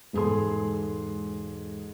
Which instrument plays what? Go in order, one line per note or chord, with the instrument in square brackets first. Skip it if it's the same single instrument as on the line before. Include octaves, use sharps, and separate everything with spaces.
[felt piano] E1 G#2 G#4 A4 C6